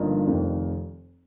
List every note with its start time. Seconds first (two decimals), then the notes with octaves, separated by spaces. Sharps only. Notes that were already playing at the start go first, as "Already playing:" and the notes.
Already playing: G1 G2 F3 A#3 D#4
0.27 F1 F2 D#3